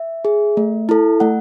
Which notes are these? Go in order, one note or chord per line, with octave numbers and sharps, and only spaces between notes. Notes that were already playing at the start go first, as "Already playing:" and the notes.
Already playing: E5
G#4
A3
E4 A4
A3 F#5